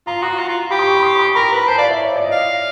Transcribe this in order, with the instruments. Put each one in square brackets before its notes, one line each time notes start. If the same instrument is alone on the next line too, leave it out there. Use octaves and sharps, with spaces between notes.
[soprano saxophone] F4 [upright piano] A#5
[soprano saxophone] F#4 [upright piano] C6
[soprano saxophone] F4 [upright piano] A#5
[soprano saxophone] F4
[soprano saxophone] G4 [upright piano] B5
[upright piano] C6
C#6
B5
C6
C6
[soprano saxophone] A#4 [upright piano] B5
[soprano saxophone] B4 [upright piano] A#5
[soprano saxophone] C5 [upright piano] A5
[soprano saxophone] D5 [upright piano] F5
[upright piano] E5
C#5
D5
D#5
[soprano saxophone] F5